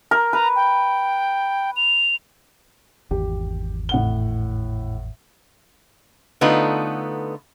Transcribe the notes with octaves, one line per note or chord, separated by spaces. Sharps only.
A#4
B4 A#5
G5
F7
G#1 E2 G4
A2 F#5 G7
D3 A3 B3 D#4 F4 B4